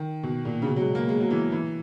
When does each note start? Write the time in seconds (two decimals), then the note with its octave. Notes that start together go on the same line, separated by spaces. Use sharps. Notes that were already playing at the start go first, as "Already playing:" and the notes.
Already playing: D#3
0.23 B2
0.45 A#2
0.62 C#3
0.66 B2
0.76 F#3
0.80 G#3
0.95 A#3
1.09 G#3
1.21 F#3
1.31 E3
1.52 E3